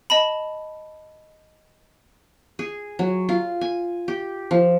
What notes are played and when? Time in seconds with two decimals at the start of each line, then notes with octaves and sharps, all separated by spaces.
0.10 D#5 A5 B5
2.59 G#4
2.99 F#3
3.29 F4
3.61 G#5
4.08 G4
4.51 F3